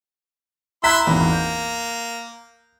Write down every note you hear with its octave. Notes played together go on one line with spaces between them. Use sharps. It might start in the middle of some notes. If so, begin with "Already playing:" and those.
E4 A#5 C6 E6 F#6 B6
G#1 E2 A#3 B5
G6